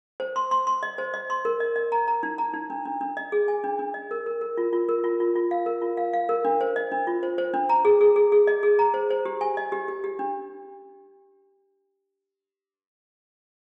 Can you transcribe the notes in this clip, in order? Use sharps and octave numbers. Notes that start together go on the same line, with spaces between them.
C5
C6
C6
C6
D#5
C5
D#5
C6
A#4
D#5
D#5
A#5
A#5
D#4
A#5
D#4
D4
D4
D4
D#5
G#4
G#5
D4
D4
D#5
A#4
A#4
A#4
F4
F4
A#4
F4
F4
F4
F5
A#4
F4
F5
F5
A#4
D4
C5
D#5
D4
F4
C5
C5
D4
A#5
G#4
G#4
G#4
G#4
D#5
G#4
A#5
C5
C5
G4
G#5
D#5
G4
G4
G4
D4